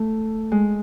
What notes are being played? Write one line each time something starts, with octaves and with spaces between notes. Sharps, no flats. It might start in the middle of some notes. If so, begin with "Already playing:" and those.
Already playing: A3
G#3